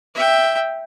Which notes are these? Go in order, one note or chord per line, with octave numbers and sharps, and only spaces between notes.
E5 G5